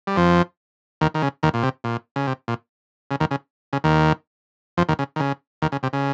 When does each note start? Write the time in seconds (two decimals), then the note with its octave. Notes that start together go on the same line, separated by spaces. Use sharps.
0.07 G3
0.16 F2 F3
1.01 D#2 D#3
1.14 D#3
1.22 C#3
1.43 D#2 D#3
1.54 A#2
1.63 C3
1.84 A#2
2.16 C#3
2.27 C3
2.48 A#2
3.11 C#3
3.20 D#2 D#3
3.31 C#3
3.73 C#3
3.84 D#2 D#3
4.77 F2 F3
4.89 D#2 D#3
4.99 C#3
5.16 D#3
5.20 C#3
5.62 D#2 D#3
5.72 C#3
5.83 C3
5.93 C#3